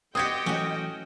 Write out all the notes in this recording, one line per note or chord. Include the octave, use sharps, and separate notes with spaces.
C4 F#4 G4 D#5 G5 D#6 G#6 C#7
E3 F#3 A3 C#4 F#4